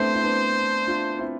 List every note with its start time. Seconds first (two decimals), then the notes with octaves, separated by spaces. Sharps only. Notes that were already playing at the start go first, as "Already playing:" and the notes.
Already playing: A3 B3 C4 D4 E4 C5
0.14 E4
0.23 B3 D4
0.87 D4 F4
1.18 C4 E4